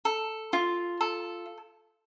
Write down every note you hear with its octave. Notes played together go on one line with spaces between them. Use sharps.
A4
F4
A4